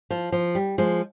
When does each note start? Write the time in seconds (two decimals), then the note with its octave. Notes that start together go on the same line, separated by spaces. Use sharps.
0.10 F3
0.32 F3
0.55 G3
0.78 F3 G#3